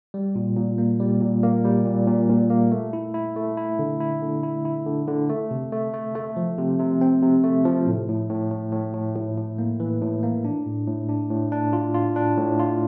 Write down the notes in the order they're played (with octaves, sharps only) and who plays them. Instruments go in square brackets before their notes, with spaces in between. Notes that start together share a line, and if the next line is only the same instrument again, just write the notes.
[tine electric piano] G3
A#2
A#2
A#3
G3
A#2
A#3
G3
A#2
A#2
A#2
A#3
A3
E4
E4
A3
E4
D3
E4
D3
E4
E4
D3
D3
A3
C3
A3
A3
A3
F3
C3
C3
C4
C3
A3
F3
A2
A2
A2
A2
A2
A2
A2
A2
A#3
E3
A2
A#3
D4
A2
A2
D4
A2
D4
F4
F4
D4
A2
F4